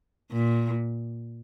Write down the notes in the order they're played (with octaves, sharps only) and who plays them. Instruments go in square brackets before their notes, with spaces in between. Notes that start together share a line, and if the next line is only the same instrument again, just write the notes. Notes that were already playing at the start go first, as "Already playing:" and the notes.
[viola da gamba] A#2